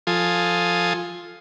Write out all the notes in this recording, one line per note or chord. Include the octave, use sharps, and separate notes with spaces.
F3 F4 A4 G#5 D#6